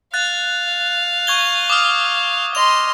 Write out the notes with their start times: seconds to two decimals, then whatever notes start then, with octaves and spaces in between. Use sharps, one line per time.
0.14 F5 F#6 A6
1.27 C#6 G#6 G7
1.70 D6 D#6 F6
2.55 D#5 C6 F7